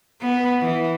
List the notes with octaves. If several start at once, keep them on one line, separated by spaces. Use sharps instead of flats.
B3
E3